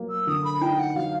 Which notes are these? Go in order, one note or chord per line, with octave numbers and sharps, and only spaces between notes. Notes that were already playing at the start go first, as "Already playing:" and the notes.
Already playing: F#3 A#3
E6
D3 D#6
B5
D#4 G5
F#5
F#3 F5